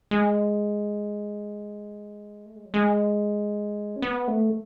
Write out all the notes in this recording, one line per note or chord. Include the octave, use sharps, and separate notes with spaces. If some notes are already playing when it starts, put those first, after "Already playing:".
G#3
A3
G#3
F#3
G#3
C#4
B3
A3